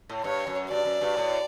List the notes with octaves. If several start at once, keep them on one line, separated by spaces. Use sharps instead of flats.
A2
G2 C#5
F#2
G2 D5
F#2
G2
A2